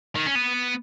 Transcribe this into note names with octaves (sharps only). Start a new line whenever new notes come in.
D#3
C#4
B3